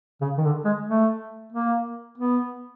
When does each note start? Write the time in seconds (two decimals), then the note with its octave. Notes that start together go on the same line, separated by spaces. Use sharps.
0.21 C#3
0.38 D#3
0.44 D3
0.65 G#3
0.87 A3
1.52 A#3
2.18 B3